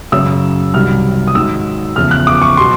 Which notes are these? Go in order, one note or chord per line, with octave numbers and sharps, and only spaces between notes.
F#2 C#3 F#3 E6
C2 C3 D#3 F#3 F6
D#6
G#2 D#3 F#3 E6
E2 C#3 F3 F6
F#6
D6
C#6
B2 F#3 C6